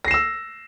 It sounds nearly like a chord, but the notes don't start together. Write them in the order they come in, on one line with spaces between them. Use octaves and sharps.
A#6 C7 E7 E6